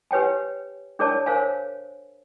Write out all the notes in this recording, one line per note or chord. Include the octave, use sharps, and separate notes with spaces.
G4 B4 C#5 G5 G#5
D4 G#4 A#4 C#5 D5 A5
A#4 C5 C#5 F5 G#5